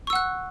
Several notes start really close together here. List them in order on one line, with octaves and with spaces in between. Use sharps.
C#6 E6 F#5 F#6